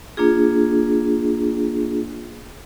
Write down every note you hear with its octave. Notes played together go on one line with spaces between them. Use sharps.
A#3 D4 F4 G#4